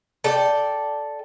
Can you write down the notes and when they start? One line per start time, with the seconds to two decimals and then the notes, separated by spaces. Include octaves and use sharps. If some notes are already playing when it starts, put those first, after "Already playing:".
0.24 A4 D5 G5